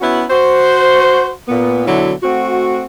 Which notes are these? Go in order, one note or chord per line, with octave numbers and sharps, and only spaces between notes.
B3 C#4 E4 F#4 B4
F#4 C5
A#2 B3
B2 D3 F#3 E4
A3 C4 F#4